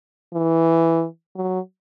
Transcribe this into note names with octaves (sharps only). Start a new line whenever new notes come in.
E3
F#3